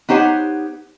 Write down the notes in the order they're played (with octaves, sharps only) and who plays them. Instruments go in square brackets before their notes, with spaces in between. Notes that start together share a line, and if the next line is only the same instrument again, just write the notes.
[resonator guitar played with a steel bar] B3 D#4 G4 C5 C#5 F#5